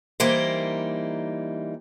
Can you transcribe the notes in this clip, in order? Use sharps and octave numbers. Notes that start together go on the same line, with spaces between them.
E3 G3 A#3 D#4 C5